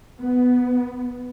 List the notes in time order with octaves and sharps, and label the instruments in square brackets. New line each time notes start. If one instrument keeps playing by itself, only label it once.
[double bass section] B3